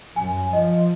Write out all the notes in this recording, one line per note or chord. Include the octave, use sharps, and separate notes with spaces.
F#2 G#5
F3 D#5